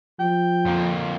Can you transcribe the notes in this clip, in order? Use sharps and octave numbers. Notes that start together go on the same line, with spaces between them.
F3 G5
F2 A#3